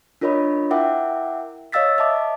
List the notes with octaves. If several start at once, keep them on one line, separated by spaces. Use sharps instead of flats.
D4 F4 A#4 C#5 D#5 B5
E4 A#4 E5 F#5 G5 D6
C#5 D#5 F5 E6 A6 B6
D#5 E5 A5 D6